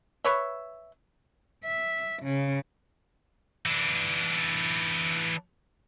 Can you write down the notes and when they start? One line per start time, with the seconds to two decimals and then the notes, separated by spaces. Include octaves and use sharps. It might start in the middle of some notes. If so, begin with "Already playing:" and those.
0.25 B4 C#5 E5
1.65 E5
2.23 C#3
3.66 E3 D4